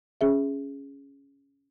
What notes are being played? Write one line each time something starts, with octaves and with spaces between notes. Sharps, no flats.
C#4 G#4 E5